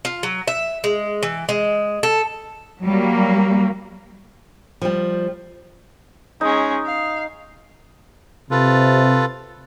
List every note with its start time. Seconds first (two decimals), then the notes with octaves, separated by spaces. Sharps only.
0.05 F4
0.23 F#3
0.48 E5
0.84 G#3
1.23 E3
1.49 G#3
2.03 A4
2.82 F#3 G3 A#3
4.82 F3 G3
6.41 G#3 C#4 D#4
6.86 F5
8.51 C3 F4 A4 B4